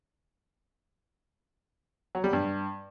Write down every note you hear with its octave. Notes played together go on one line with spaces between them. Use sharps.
F#3
G3
G2